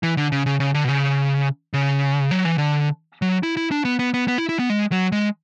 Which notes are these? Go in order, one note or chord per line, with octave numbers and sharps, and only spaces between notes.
E3
D3
C#3
C#3
C#3
D3
B2
C#3
C#3
F#3
E3
D3
F#3
E4
E4
D4
B3
B3
B3
B3
E4
E4
B3
G#3
F#3
G#3